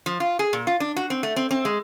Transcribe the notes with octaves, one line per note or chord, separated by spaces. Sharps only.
F3
F4
G#4
A#2
F4
D4
F#4
C4
A3
C4
C4
G#3